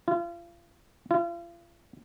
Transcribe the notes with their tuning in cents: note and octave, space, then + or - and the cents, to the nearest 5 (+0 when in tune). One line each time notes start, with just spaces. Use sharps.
F4 -35
F4 -40